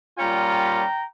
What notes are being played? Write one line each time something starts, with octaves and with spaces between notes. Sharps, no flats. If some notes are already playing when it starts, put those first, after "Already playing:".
A#2 G3 C#4 F4 G5 A#5